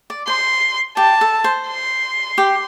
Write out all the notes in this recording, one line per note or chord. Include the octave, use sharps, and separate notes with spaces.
D5
C5 C6
G4 A5
A4
C5
C6
G4